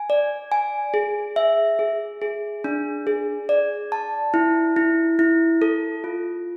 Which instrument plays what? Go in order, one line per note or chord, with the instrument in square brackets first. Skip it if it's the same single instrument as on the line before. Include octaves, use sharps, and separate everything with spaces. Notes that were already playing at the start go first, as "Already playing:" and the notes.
Already playing: [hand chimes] G#5
D5
G#5
G#4
E5
G#4
G#4
D4
G#4
D5
A5
E4
E4
E4
A4
F4